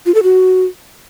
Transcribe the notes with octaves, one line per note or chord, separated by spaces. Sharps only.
F4
A4
F#4